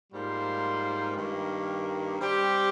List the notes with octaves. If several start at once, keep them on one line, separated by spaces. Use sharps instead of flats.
G#2 G3 A#3 F4 C5
G2 D#3 A#3
G3 C4 G4